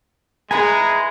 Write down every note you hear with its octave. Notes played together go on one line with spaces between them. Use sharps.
G#3 E4 G#4 B4 G#5 A#5